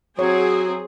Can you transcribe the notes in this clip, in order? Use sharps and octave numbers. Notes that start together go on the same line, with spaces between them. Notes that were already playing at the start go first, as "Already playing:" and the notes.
F#3 C4 G#4 C#5